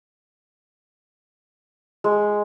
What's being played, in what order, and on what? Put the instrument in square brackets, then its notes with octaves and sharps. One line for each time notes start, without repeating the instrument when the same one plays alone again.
[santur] G#3